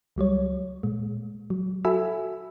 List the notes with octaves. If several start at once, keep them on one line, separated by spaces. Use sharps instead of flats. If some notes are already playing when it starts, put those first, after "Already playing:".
C#2 F#3 G3 C#5
A#2 G#3
F#3
F#4 A4 E5 G#5 B5 E6